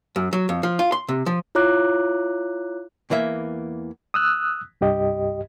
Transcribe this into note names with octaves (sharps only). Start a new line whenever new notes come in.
F#2
F#3
F2
F3
F4
C6
C3
F3
E4 F4 C#5 A#5 D6 F#6
E2 E3 A#3 E5
D#6 E6 F#6
C2 G2 G4 D#5